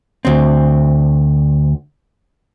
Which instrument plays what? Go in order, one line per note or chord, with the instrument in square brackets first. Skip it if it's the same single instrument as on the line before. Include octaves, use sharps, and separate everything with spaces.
[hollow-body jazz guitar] D2 C4